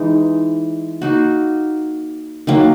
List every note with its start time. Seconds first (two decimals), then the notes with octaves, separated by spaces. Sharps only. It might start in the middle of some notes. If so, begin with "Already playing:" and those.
Already playing: E3 G#3 D#4
1.02 A#3 D#4 F#4
2.47 D#3 F#3 A#3